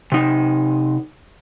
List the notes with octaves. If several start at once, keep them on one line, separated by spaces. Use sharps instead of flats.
C3 D#4